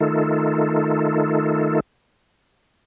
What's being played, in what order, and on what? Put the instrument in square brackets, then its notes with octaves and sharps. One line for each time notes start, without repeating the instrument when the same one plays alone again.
[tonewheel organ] D#3 A3 D#4 F4 A4